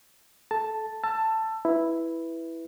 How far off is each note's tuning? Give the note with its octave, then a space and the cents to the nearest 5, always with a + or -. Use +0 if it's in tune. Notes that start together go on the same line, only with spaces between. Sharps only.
A4 -20 A5 +0
A5 +10 E6 +25
E4 +0 B4 +0